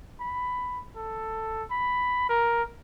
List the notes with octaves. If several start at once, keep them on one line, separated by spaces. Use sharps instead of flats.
B5
A4
B5
A#4